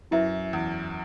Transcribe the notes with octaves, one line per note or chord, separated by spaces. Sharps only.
F#2 E4 B4 E5
E2